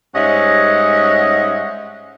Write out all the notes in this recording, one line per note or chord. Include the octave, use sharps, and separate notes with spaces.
G#2 G3 C#4 D#5 E5 F#5